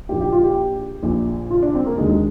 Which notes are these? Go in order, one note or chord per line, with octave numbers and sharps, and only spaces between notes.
A#1 A#2 G4
G4
F4
G4
A#1 A#2
F4
D4
C4
A#3
D#2 D3 G#3
G#3